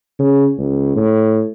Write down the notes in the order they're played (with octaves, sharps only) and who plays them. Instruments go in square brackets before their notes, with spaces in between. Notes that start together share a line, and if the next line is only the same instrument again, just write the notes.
[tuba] C#3
C#2
A2